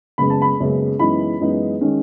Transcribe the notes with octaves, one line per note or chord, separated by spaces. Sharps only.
F#1 F#2 C#3 G#3 B3 B5
A5
B5
F#1 F#2 C#3 G#3 B3
F#2 E3 G#3 B3 D#4 B5
F#2 E3 G#3 B3 D#4
D#3 G#3 C#4